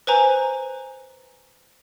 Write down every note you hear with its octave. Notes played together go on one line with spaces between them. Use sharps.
B4 C5 G#5 A#5